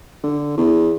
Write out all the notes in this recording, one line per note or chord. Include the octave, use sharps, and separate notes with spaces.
D3
E2